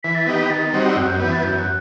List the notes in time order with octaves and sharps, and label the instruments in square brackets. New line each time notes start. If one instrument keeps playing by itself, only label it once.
[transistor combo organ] E3 [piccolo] B6
[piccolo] A6
[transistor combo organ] B3 D#4 G4 [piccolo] B6
[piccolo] B6
[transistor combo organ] D#3 [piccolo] A6
[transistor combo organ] G3 C4 D#4 F#4
[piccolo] E6
[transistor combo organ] F#2 [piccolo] F#6
[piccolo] G6
[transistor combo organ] E3 B3 [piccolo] G6
[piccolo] A6
[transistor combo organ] F#2 [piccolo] G6
[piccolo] F#6